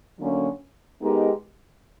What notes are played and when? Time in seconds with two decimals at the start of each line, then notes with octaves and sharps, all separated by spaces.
0.18 D3 F#3 A#3 C#4
1.01 G#3 B3 D#4 G4 A#4